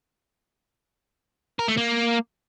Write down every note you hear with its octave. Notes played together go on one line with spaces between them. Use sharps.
A#4
A3
A#3